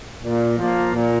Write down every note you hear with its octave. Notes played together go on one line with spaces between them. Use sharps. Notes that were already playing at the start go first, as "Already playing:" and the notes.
A#2
F3 A#3
A#2